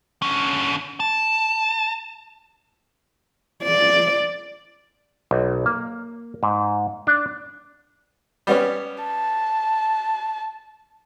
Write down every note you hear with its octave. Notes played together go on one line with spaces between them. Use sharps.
D3 C#4
A5
D5
B1
A#3
G#2
D4
G3 B3 C#4
A5